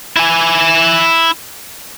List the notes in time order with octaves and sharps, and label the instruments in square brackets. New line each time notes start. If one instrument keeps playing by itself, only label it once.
[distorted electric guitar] E4 G#5